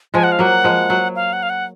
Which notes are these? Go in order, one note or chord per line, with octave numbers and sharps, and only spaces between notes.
F3 G#3 G#5
F#5
F5
F#3 A#3 F#5
F3 G#3
F#3
F5
F#5
F5
F#5